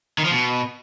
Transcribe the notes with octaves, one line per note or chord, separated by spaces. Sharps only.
D#3
F3
B2